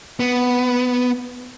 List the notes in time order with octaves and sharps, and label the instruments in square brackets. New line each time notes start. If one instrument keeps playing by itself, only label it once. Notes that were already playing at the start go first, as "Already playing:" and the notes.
[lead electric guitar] B3